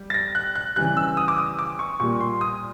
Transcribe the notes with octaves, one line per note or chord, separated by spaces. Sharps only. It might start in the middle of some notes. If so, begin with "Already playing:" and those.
Already playing: G3
A6
A#6
F#6
F#6
C#3 E3 G3 F#6
E6
D#6
D6
D#6
D6
C#6
A#2 G3 C#6
C6
D#6